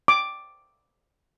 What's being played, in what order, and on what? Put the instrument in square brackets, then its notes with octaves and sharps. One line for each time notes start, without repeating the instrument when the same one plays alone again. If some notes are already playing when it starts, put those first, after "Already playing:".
[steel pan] D6